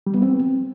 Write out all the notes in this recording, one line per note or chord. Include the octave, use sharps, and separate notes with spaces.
G3
B3
C4